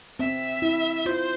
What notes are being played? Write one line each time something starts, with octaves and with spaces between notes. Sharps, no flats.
C4 E5
E4
F4 C5